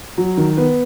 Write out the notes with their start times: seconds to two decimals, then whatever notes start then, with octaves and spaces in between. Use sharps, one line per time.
0.18 F#3
0.37 D#3
0.57 B3